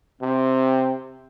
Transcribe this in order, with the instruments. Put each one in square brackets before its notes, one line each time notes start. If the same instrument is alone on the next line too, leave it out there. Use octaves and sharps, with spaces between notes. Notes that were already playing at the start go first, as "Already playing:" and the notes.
[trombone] C3 [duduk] C4